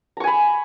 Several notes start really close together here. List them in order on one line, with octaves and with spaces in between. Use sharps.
A#5 C#6 G#5 B5